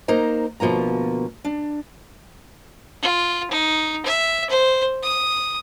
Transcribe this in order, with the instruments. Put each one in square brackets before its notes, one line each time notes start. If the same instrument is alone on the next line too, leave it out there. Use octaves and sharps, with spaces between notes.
[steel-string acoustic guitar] A#3 D#4 C5 A#5
D2 B2 F3 A#3 A#5
D4
[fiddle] F4
D#4
E5
C5
D#6